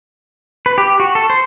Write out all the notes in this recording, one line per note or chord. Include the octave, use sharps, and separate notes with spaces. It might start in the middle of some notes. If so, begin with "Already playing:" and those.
B4
G4
F#4
A4
C5